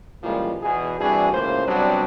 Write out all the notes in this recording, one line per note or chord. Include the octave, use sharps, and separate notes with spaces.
A#2 C#3 E3 F3 G3 G#3
E2 B2 E3 G#4
C3 E3 G3 D4 F#4 G#4
C#2 A2 C#3 A#3 C5
C3 F#3 G3 B3 C4 D4